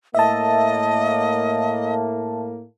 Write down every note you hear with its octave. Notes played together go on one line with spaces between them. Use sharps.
A2 A#3 D#5 E5 A5